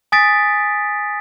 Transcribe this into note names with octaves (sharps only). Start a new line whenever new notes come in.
G#5 D#6 A6 B6 D7